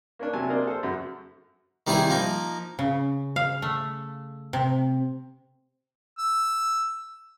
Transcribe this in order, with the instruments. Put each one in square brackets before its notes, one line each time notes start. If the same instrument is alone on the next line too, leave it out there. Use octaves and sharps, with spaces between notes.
[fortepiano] A#3 C#4 D4
C3 F#3 G#5 A5
A#3 D4 A#4 C5 D5 D#5
A4 C5
F#2 C#3 F#4
[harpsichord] D#3 G3 C4 E4 G#4
F3 A#3 D#4
[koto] C#3
F5
A3
C3
[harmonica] E6